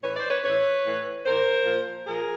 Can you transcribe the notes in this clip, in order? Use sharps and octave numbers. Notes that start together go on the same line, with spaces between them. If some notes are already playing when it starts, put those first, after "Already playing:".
A2 E3 B4 C#5
C5 D5
B4 C#5
A2 E3 B4 C#5
A2 E3
A2 E3 A#4 C5
A#2 F3
A#2 F3 G#4 A#4